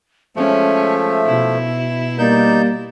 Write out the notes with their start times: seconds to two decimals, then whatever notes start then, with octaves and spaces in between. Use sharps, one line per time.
0.36 F3 G#3 A3 C#4 E5
1.26 B2 E4
2.19 G3 A#3 D#4 D5 G6